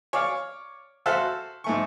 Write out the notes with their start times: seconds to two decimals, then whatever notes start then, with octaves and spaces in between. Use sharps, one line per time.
0.13 C#5 D5 F5
1.06 F#4 A4 C5 E5 F5
1.64 G#2 A3 C#6